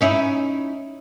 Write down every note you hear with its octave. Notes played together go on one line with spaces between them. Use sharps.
C#4 D#4 E4